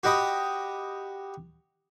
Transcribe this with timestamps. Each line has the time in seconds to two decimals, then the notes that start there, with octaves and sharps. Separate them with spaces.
0.03 F#4 G4 D#5 B5 D#6